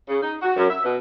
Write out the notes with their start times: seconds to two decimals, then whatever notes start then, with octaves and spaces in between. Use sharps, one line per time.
0.09 C#3
0.23 D#4
0.41 F#4
0.57 F#2
0.70 E5
0.84 B2